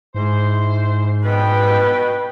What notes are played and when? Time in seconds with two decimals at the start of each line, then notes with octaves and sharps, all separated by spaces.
0.15 G#2 E4 C5
1.24 B2 B4 G5